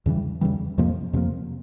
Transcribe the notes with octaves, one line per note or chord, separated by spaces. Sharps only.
E2 C#3 E3 G3
E2 C#3 E3 G3
F2 C3 F3 A#3
F2 C3 F3 A#3